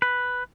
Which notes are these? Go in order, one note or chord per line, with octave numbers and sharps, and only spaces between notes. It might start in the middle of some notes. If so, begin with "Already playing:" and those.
B4